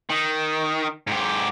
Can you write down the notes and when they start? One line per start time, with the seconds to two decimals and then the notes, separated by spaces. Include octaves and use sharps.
0.10 D#3
1.07 G#2 G4